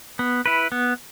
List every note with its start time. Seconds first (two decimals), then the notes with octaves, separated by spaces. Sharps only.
0.19 B3
0.46 E4 B4
0.72 B3